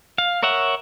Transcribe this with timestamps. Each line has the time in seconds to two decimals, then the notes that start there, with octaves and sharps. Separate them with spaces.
0.18 F5
0.43 A#4 C#5 E5 F#5